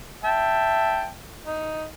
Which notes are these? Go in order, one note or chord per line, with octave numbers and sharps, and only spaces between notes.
E5 G5 A5
D#4